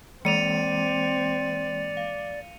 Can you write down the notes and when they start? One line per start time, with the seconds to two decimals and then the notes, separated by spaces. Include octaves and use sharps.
0.25 E3 G#3 A#3 C4 D5 C#7 D#7 F7
1.97 F5